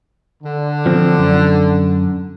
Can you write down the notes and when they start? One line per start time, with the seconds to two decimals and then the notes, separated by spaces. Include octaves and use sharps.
0.43 D3
0.86 F3 C4
1.18 F#2